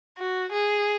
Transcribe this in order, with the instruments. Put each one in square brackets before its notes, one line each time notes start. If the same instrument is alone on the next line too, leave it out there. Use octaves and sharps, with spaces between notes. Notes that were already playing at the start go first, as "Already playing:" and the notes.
[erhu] F#4
G#4